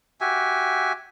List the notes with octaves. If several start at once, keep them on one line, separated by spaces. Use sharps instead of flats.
F#4 G4 E5 G#5